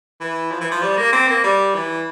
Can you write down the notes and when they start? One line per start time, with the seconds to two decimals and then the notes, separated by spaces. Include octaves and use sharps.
0.20 E3
0.51 F3
0.61 E3
0.71 F3
0.82 G3
0.97 A#3
1.13 C4
1.28 A#3
1.44 G3
1.75 E3